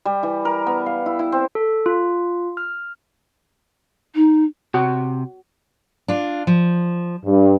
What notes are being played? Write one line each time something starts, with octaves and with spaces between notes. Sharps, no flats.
G3
E3
A#4
B3
F5
E4
E4
C4
A4
F4
F6
D#4
C3 F#4
D4 F4
F3
G2